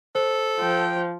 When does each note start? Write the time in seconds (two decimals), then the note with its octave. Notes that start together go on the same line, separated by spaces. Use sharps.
0.15 A4 C5
0.59 F3 G5